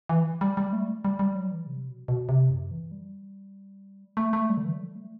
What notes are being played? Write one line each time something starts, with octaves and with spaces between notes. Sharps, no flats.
E3
G3
G3
A3
G3
G3
G3
F#3
E3
C3
B2
B2
C3
F#2
E3
G3
A3
A3
G3
D3
E3
F#3
G3
A3